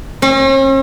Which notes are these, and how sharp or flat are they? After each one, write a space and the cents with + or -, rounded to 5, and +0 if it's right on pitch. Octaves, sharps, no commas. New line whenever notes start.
C#4 -45